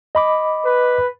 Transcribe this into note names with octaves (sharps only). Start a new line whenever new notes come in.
D#5 B5 D6
B4